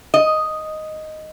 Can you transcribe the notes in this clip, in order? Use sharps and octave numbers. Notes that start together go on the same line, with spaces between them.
D#5